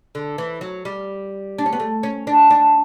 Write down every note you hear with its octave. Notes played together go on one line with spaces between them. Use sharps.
D3
E3
F#3
G3
D4
C#4
B3
A3
C#4
D4
D4